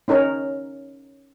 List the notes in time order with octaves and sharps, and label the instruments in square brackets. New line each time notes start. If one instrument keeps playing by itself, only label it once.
[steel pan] C#4 D#4 A#4 C#5